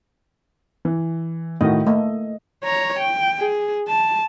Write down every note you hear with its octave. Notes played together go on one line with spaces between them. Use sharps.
E3
A2 D#3 F#4 D#5
A3 A#3 D#5
C#5 A#5
G5
G#4
A5